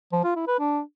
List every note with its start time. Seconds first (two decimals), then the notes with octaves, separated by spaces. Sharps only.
0.13 F3
0.24 F4
0.36 E4
0.48 B4
0.59 D4